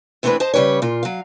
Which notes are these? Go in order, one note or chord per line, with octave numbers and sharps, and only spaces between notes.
E3 A3 C4 D4 G#4 B4
C5 D#5 A5
C#3 G3 B4 C#5
A#2 F4
F#3 F5